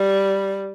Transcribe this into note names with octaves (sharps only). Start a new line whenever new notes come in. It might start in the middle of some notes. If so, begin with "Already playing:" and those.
Already playing: G3